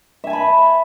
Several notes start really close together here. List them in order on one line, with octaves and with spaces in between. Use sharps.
E5 G#5 A5 B5